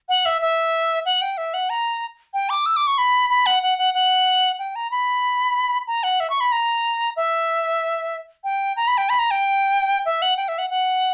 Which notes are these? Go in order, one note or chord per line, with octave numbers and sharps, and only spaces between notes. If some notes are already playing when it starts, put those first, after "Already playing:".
F#5
E5
E5
F#5
G5
E5
F#5
A#5
G5
D6
E6
D6
C#6
B5
B5
F#5
F#5
F#5
F#5
G5
A#5
B5
A#5
F#5
E5
C#6
B5
A#5
E5
G5
A#5
B5
G5
B5
A#5
G5
E5
F#5
G5
E5
F#5
F#5